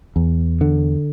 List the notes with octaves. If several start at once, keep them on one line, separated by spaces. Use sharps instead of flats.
E2
D3